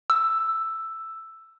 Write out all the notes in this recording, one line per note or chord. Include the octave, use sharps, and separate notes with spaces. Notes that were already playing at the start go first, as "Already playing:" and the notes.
E6